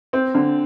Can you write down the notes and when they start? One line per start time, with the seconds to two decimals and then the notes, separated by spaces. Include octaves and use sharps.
0.13 C4
0.35 D3